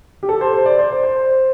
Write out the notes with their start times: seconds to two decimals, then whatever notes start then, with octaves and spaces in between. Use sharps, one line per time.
0.23 G4
0.29 A4
0.41 C5
0.53 C5
0.66 D5
0.79 C5
0.92 C5
1.03 C5